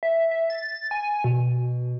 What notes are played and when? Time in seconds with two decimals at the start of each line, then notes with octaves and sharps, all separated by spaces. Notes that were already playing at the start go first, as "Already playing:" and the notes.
0.03 E5
0.31 E5
0.50 A6
0.91 G#5
1.24 B2